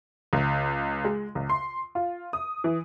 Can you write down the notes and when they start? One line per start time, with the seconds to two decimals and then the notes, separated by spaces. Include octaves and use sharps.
0.33 C#2
1.04 G#3
1.35 C#2
1.49 C6
1.95 F4
2.33 D#6
2.64 E3